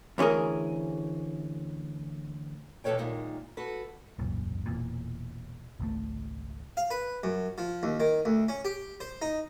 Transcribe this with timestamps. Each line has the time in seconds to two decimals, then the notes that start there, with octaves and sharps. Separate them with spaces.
0.18 D2 E3 C#4 G#4 A#4
2.84 E2 B2 A4 B4 C#5 G5
2.98 F#2 A#2 D#3 G#3
3.57 F#4 A4 B4
4.19 E1 C#2 F#2 A#2
4.66 E1 E2 A#2
5.80 G#1 C#2 A3
6.77 F5
6.91 B4
7.23 F#2
7.58 F3
7.83 D#2
8.00 D#3
8.25 D2
8.49 C#4
8.65 G4
9.00 C5
9.22 D#4